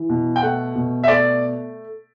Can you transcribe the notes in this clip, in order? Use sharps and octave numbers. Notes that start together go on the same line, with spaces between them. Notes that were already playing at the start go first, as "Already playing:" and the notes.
Already playing: E3
B2
G5
A3 F#5
B2
E5
A3 D5